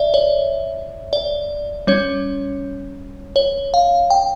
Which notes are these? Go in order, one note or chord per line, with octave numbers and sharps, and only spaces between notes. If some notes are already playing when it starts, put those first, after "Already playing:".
Already playing: D5 E5
C#5
D5
G3 C#4 C#5
C#5
F5
G5